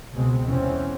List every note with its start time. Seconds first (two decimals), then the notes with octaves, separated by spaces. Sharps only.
0.13 C#2 B2 G#3 C4
0.44 E2 C3 E3 C4 C#4